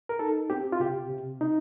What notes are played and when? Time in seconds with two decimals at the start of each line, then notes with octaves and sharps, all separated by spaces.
0.09 A#4
0.19 D#4 A4
0.50 C4 G4
0.72 F4
0.80 C3 G4
1.10 C3
1.41 D#4